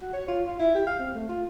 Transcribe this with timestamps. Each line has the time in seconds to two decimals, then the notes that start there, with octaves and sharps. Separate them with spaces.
0.02 F#4
0.13 C#5
0.28 F4
0.47 F4
0.59 E4
0.74 G4
0.86 F5
0.99 C4
1.15 A3
1.29 F4